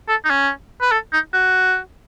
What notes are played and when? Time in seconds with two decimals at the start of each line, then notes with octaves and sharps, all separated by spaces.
0.09 A4
0.25 D#4
0.30 C#4
0.81 B4
0.92 A4
1.13 D#4
1.34 F#4